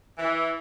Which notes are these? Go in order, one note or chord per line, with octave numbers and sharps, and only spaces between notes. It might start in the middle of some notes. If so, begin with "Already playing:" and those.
E3